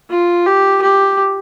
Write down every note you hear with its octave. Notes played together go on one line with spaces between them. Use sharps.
F4
G4
G4